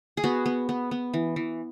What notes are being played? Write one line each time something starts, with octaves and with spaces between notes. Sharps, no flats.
G#4
B3 F#4
B3
B3
B3
E3
E3